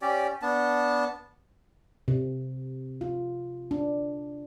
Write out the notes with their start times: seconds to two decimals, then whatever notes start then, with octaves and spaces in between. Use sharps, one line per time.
0.02 C#4 G4 D5
0.42 B3 D4 A5
2.08 C3
3.01 F4
3.71 D4